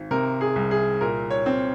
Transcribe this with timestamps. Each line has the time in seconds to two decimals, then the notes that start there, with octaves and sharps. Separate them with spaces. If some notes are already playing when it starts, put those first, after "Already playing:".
Already playing: G#1
0.11 C3 A#4
0.41 G#4
0.56 C2
0.71 G#4
1.01 A#2 A#4
1.30 C#5
1.46 C4